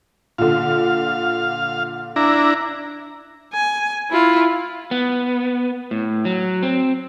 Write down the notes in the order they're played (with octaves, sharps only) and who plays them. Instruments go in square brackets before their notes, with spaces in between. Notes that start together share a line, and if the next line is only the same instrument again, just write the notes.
[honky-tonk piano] A#2 D3 [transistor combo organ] F5
[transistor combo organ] D4 E4 A#5
[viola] G#5
E4 F4
[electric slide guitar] B3
A2
F#3
C4